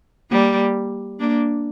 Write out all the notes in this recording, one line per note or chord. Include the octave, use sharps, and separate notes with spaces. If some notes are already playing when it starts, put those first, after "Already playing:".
G3 A#3
A#3 D4